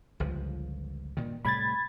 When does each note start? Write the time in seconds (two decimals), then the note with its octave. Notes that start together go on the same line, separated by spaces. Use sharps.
0.20 G1 C#2 F3
1.17 G2 A#2 D#3
1.45 A2 C3 G3 B5 G#6 A6